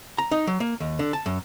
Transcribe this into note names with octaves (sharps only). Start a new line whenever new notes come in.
A#5
D#4
F#3
A#3
D#2
D3
A5
F#2